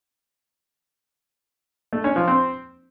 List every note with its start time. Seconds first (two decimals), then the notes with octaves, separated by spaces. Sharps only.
1.93 A3
2.04 C#4
2.16 F3
2.28 C4